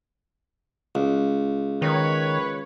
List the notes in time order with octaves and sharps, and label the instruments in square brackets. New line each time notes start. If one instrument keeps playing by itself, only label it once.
[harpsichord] C#2
[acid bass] D#3 [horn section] B4 C#5